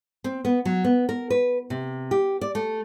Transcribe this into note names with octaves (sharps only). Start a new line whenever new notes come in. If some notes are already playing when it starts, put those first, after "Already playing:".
C4
B3
F#3
B3
A#4
B4
C3
G4
D5
A3